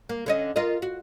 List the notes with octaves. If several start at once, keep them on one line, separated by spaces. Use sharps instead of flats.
A#3
D3 C#4 D#5
F4 A#4 D#5
F#4